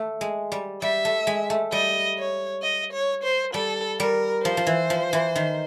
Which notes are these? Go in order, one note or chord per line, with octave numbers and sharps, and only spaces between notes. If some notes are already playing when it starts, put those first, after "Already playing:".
Already playing: A3
G#3
G3
G3 E5
A3
G#3
A3
G3 D#5
C#5
D#5
C#5
C5
G3 A4
G3 A#4
F3 C5
F3
E3
F3
E3
D#3